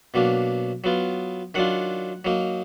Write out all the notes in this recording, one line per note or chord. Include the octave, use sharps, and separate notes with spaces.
B2 F#3 A#3 D4
F#3 B3 F4
D#3 F#3 D4 F4 F#5
F#3 A#3 D#4